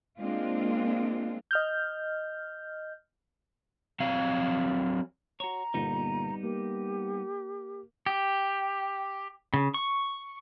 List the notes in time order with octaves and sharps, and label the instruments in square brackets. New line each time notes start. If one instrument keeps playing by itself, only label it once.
[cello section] G#3 A#3 C4 D4 F4
[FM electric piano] D#5 F6 G6
[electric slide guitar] F#3 C4 F5
[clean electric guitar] F#4 C#5 [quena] A#5
[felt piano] G1 A#2 [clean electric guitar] G3 B3 D#4
[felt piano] A#3 [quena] G4
[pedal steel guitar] G4
C#3
C#6